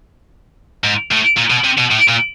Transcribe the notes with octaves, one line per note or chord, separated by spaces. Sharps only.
G#2
A2
A#2
B2
C3
B2
A2
A#2